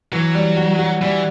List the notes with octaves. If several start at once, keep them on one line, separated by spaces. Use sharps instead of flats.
E3 F#3
G3
F#4
F#4
E3 G3